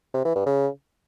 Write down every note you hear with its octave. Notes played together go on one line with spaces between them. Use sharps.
C3
E3
G2
C#3